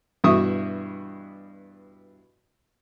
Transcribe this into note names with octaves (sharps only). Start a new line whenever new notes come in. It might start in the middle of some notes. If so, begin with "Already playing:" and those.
G2 B2 E3 E5 C#6 D#6